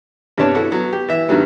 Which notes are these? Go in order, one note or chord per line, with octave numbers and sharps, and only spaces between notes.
G2 C3 B3 D4 C#5 A5
E4 F#4 A4
F#3 B3
G4
E3 E5
G2 D#3 F#3 G3 B3